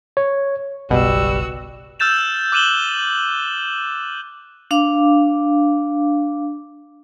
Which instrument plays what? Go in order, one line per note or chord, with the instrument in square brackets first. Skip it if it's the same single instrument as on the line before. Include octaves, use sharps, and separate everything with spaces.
[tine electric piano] C#5
[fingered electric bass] F#1 B1 [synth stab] B2 [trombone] G3 [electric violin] F#4 E6
[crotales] E6 F6 G6 A6 E7 F7
D6 F#6 D#7 E7 F#7 G7
[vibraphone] D4 F5 D6